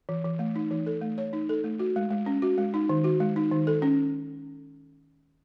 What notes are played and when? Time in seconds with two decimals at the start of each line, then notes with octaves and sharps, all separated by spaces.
0.09 E3
0.25 E3
0.39 A3
0.56 D#4
0.71 E3
0.86 A4
1.01 A3
1.18 C#5
1.33 D#4
1.49 A4
1.64 A3
1.79 F#4
1.96 G#3
2.10 G#3
2.26 C#4
2.42 F#4
2.58 G#3
2.74 D#4
2.89 D#3
3.04 F#4
3.20 G#3
3.36 D#4
3.51 D#3
3.67 A4
3.82 C#4